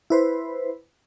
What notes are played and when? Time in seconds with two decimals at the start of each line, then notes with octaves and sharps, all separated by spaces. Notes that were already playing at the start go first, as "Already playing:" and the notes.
0.10 E4 B4 C5